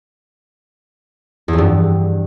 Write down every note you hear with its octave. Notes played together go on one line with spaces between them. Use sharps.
E2
F2
G2